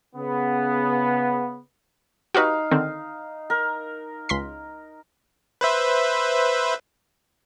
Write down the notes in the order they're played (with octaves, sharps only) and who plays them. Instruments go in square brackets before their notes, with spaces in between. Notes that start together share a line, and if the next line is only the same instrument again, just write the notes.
[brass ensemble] C#3 B3
[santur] D#4 F5 [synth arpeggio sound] F#4 G4 B4
[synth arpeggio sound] D3 D#3 C4
[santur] A#4
[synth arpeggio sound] C#2 C6 B6
[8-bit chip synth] B4 C5 E5